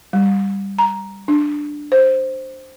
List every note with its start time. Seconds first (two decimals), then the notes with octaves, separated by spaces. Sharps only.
0.13 G3
0.79 A#5
1.28 D4
1.92 C5